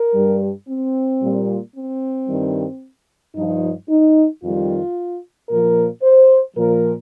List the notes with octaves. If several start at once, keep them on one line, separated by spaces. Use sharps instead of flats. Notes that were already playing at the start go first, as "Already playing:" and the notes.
Already playing: A#4
G2 G3
C4
A#2 G3
C4
G2 D#3 G3
G2 F3 D#4
D#4
F2 D#3 G3 F4
A#2 F3 A#4
C5
A#2 F3 A#4